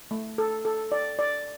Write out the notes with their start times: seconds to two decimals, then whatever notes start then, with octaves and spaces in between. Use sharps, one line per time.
0.11 A3
0.38 A4
0.65 A4
0.92 D5
1.19 D5